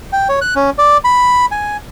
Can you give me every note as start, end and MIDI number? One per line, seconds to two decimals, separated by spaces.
0.13 0.28 79
0.29 0.39 73
0.41 0.54 90
0.56 0.70 61
0.78 0.98 74
1.04 1.46 83
1.51 1.77 80